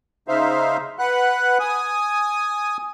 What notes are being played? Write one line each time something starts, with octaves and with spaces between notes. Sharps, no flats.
C#3 D#4 C5 E5 F5
B4 F#5 F#6
G#5 D#6